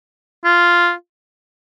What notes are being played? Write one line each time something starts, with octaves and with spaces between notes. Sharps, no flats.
F4